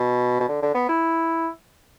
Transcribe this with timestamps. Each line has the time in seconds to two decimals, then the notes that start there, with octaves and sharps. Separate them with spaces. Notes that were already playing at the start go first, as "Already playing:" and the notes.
Already playing: B2
0.40 B2
0.49 D3
0.62 D3
0.74 B3
0.89 E4